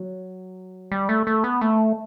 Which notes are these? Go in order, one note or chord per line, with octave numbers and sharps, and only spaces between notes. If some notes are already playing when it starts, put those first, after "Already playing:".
Already playing: F#3
G3
A3
A3
B3
A3